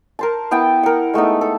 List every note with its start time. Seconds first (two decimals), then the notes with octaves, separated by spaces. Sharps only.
0.19 A#4 C5 A5
0.51 B3 E4 G5 A5
0.83 A#4 F#5
1.14 G#3 A3 B3 D#4
1.41 A4